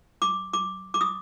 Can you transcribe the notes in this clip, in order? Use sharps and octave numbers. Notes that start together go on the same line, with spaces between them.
D6
D6
D6
D#6